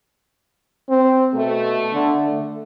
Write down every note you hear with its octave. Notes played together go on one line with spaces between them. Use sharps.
C4
B2 A3
D3
A3